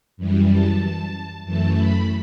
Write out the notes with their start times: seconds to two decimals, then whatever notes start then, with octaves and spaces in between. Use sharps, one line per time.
0.17 F#2 E3 G3
0.49 A5
1.45 F#2 E3 A3 A5
1.77 B5